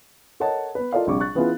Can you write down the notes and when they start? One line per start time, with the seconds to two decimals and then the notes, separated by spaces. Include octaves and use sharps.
0.40 A4 A#4 C#5 D#5 F#5 A5
0.75 B3 B4
0.93 F4 A4 A#4 D5 D#5 F5
1.07 A#1 C3 G3 C#6 D6
1.20 C#6 F#6 A6
1.35 E3 B3 C#4 E4 F4 G#4